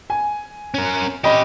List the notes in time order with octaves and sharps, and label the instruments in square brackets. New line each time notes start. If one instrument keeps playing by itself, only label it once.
[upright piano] G#5
[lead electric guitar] C#4 A#4
[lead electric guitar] C#4 G4 [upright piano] D#5 B5